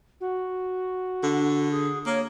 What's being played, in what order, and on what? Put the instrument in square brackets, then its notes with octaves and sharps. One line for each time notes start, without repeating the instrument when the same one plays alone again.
[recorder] F#4
[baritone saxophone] D3
[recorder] G#4
[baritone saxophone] A#3 [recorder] C#5